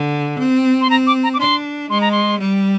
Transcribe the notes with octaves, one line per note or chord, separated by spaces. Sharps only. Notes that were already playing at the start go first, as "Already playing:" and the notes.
Already playing: D3
C4
C6
C4 A#5
D6
A#5
D6
D4 C6
G#3 C6
A#5
C6
G3